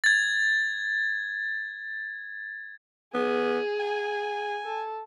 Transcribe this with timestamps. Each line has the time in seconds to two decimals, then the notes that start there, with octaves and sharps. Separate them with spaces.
0.04 G#6 A6
3.14 B3 G#4
3.80 G#5
4.64 A4